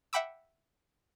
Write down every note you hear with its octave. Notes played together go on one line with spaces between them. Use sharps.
E5 F#5 G5 B5 D6 E6